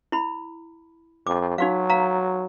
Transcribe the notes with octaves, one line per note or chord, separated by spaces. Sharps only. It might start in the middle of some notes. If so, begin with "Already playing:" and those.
E4 B5
F2 D6
F#3 D#4 F#4 F5
F5 A#5